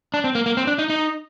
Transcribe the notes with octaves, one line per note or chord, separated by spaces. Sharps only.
D4
C4
A#3
A#3
C4
D4
D#4
D#4